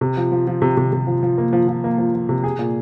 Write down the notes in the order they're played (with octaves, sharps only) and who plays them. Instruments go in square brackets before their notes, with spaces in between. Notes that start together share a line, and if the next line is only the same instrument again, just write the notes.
[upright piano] C3
F3
F3
F3
C3
C3
C3
F3
F3
A#3
F3
F3
A#3
F3
F3
C3
G#4
A#2